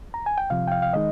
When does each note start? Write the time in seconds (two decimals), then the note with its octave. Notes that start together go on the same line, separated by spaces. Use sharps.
0.14 A#5
0.26 G#5
0.38 G5
0.50 C2 C3 F3 F5
0.67 G5
0.72 F5
0.82 F5
0.93 D#3 G#3 D#4 D#5